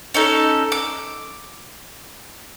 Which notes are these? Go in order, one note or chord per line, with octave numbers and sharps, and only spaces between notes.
C#4 D#4 A4
D6